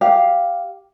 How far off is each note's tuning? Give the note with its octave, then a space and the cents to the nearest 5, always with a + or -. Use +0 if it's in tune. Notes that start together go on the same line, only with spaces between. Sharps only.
G4 +0 F5 +0